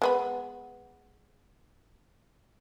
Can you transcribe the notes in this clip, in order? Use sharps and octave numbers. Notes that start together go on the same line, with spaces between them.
G#3 B3 B5